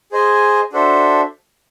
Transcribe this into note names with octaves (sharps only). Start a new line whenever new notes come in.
G#4 C5 D#5 G#5
D4 F#4 A4 C5 E5